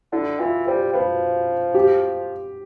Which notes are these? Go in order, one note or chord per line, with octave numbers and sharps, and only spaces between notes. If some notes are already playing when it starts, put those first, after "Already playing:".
D3 E4
E3 F4
G3 C5
F3 B4
G4